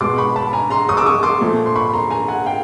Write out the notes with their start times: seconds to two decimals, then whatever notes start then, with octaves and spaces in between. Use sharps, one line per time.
0.01 B2 G#3 C6 D6
0.18 B5 C#6
0.36 A5 B5
0.53 G#5 A#5
0.70 A#5 C6
0.88 C#6 D#6
0.97 D6 E6
1.06 C#6 D#6
1.23 C6 D6
1.41 A#2 F3 A3
1.66 C6
1.75 B5 C#6
1.93 A#5 C6
2.10 G#5 A#5
2.28 F#5 G#5
2.46 F5 G5